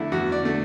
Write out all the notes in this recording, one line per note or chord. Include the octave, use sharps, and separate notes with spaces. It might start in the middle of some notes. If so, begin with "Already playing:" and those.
Already playing: E2 D3 A3 E4
E2 F#4
D5
D3 A3